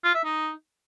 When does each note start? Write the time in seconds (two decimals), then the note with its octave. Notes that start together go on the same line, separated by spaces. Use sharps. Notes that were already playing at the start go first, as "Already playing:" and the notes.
0.04 F4
0.15 E5
0.25 D#4